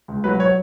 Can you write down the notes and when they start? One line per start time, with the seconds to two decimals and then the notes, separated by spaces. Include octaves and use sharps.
0.08 C#2
0.24 F#3 B4
0.40 C#5